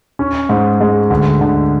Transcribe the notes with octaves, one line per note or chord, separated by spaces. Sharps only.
C#4
G#2
G#3
D2
D3